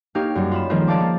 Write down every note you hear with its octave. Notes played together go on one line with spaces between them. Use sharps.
A#3 D#4 G4 C#5 F5
F#2 G3
F4 B5 E7
D#3 F3 G#3 A#3 C4 F4
D5 F5 A5 D6
A#3